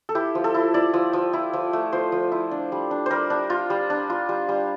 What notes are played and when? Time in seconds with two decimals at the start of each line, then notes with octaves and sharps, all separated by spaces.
0.09 A4
0.15 E4 G4
0.35 F3
0.44 A4
0.54 E4
0.74 E4 D5
0.94 F3
1.13 F3
1.33 E4
1.53 F3
1.73 A3
1.92 F3 C5
2.12 F3
2.32 E4
2.51 D4
2.72 G3
2.91 D4
3.06 G3 A#4 C5
3.30 D4
3.50 F4
3.70 G3
3.90 D4
4.10 F4
4.29 G3
4.49 G3